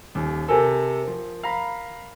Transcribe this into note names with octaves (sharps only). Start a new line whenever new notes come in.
D#1 D#2
C3 A4 A#4 G#5
F3
F5 A#5 B5